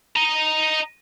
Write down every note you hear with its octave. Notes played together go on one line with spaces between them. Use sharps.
D#5 A#5